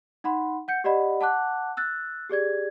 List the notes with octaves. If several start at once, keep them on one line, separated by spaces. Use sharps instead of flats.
D#4 F#5 B5 C6
F#5 G6 C#7
G4 D5 D#5 F#5 B5
F#5 A5 D6 F#6
E6 F#6 A6
G4 G#4 D5 G#6